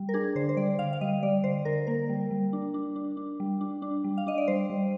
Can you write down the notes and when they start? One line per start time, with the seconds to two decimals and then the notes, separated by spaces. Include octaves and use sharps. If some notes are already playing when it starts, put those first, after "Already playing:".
Already playing: G3
0.09 A#4
0.14 D4 G#4
0.35 D3 C5
0.49 C5
0.57 G3 D5
0.79 D3 F5
0.93 F5
1.01 G3 D#5
1.23 G3 D5
1.44 D3 C5
1.65 D3 A#4
1.87 A#3 A#4
2.09 G3
2.31 G3
2.53 D4
2.74 D4
2.96 D4
3.17 D4
3.40 G3
3.61 D4
3.82 D4
4.04 G3
4.18 F5
4.27 D4 D#5
4.38 D5
4.48 G3 C5
4.70 G3